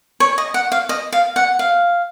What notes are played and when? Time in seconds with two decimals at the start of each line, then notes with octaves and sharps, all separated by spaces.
0.20 C#5
0.38 D#5
0.54 F#5
0.72 F5
0.89 D#5
1.12 F5
1.36 F#5
1.59 F5